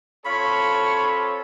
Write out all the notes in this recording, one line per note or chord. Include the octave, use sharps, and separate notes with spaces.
C4 F4 A4 C#5 B5